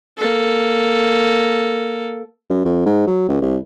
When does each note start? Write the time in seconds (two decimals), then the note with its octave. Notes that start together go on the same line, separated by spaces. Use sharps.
0.18 A#3 A4
2.50 F#2
2.65 F2
2.85 G#2
3.07 F#3
3.28 C#2
3.42 C2